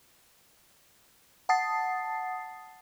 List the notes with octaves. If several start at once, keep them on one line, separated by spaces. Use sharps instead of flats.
F#5 A5 D#6 A6 C7